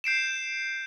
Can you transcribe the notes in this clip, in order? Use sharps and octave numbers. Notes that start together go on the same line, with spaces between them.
G6 C7 D7 E7